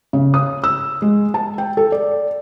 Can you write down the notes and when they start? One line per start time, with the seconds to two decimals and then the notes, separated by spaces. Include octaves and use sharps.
0.13 C#3
0.34 D#6
0.64 E6
1.02 G#3
1.34 A5
1.58 G5
1.77 A4
1.92 D5